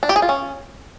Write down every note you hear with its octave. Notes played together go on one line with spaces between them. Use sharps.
D4
G4
G#4
F4
C#4